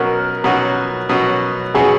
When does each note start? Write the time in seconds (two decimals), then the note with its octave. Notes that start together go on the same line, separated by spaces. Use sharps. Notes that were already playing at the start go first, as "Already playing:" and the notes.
Already playing: B2 F#3 C#4 F#4 A#4
0.44 B2 F#3 C#4 F#4
1.09 B2 F#3 C#4 F#4
1.74 B2 F#3 C#4 F#4 G#4